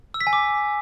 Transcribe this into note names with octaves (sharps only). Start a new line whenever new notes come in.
E6
B6
G#5
D6